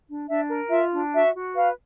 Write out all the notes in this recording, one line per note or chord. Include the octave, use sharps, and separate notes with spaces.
D4
D4 E5
A#4
F4 E5
D4
F#4 E5
F#4
B4 F5